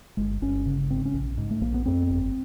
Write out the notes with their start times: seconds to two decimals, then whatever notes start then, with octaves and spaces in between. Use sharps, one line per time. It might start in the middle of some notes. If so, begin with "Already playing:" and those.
0.17 G1 G#3
0.42 G1 C#4
0.66 C#3
0.90 G#2 C4
1.05 C#4
1.14 A#1
1.38 G#2
1.51 A3
1.61 A#1 A#3
1.74 B3
1.86 F2 C4
2.10 G1